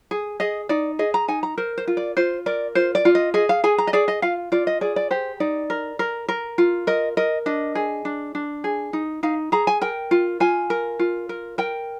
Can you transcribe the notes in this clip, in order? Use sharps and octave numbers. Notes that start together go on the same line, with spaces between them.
G#4
G#4 D#5
D#4 D5
G#4 D#5
A#5
D#4 G#5
A#5
A#4 C5
C5
F4
D5
F4 C5
A#4 D5
F4 C5
D5
F4
D#5
G#4 D#5
F5
G#4 G#5
A#5
D#5
G#4 D5
D#5
F4 F5
F4 D5
D#5
G#4 D5
D5
G4 C5
D#4 D5
A#4
A#4
A#4
F4
A#4 D#5
A#4 D#5
D4 D#5
G#4
D4
D4
G#4
D#4
D#4 F5
G#4 A#5
G#5
A#4 G5
F4
F4 G#5
A#4
F4
A#4
A#4 G5